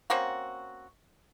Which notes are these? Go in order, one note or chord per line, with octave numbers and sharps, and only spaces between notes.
A#3 C4 C#4 F#4